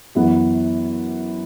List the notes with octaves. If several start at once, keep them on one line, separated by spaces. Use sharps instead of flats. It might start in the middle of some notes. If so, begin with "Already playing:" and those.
F#2 E3 B3 E4